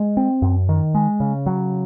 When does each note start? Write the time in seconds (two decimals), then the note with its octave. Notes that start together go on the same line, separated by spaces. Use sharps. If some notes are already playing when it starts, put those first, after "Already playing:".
Already playing: G#3
0.17 C4
0.42 F#2
0.69 D#3
0.95 G#3
1.20 C#3
1.46 F#3